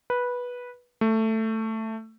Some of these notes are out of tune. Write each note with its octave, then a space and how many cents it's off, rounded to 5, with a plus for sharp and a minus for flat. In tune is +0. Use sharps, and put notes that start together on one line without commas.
B4 -10
A3 +10